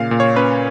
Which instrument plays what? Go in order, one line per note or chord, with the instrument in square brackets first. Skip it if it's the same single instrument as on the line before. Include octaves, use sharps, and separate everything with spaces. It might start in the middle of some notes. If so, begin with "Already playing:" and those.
Already playing: [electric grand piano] A#2 C#3 F5
A#2
C#5
C#4 B4